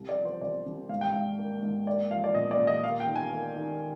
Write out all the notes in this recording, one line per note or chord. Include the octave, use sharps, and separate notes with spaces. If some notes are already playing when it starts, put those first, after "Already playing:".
Already playing: C2 G3
D5
F3
C5
C2 D5
C2
G#2 F5
G5
G#2 F5
A#3
G#2
A#3 D5
F3 F5
D5
A#2 D#5
D5
A#2
D#5
A#3 F5
G5
D#3
G#5
A#3
D#3